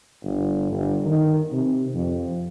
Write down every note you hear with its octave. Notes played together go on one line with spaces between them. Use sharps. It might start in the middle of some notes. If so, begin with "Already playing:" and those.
G1
G1
D#3
C3
F2